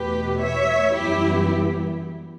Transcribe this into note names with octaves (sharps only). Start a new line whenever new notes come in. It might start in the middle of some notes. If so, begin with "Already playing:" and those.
Already playing: E2 B2 A3 G4 B4
C#5 E5
F#2 E3 G3 B3 E4 G4